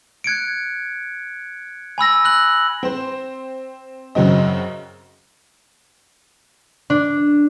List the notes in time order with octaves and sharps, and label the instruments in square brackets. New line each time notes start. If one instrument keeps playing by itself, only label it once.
[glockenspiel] F#6 G#6 C#7 D7
G#5 B5 E6 A#6
E6 F#6 F#7
[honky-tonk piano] C4 C5
F#2 C#3 F#3 C4 D#5
[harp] D4